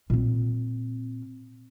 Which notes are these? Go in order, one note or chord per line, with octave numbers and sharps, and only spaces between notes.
A#2 C4